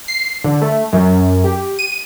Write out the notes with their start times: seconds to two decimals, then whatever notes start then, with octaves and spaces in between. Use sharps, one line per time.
0.08 C7
0.44 D3
0.62 A3
0.93 F#2
1.44 G4
1.79 D#7